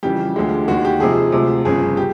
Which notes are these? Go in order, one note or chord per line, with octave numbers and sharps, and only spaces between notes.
F2 C#3 E3 G3 G4
D2 D3 F3 G#3
D#2 D#3 G#3 F#4
G4
F2 C3 F3 G#3 G#4
D2 C3 F3
G1 F2 C#3 G#4
G4